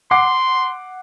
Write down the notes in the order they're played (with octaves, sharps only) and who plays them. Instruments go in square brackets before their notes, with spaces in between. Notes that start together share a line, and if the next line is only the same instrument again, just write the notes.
[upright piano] F#5 D6 C7 [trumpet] C6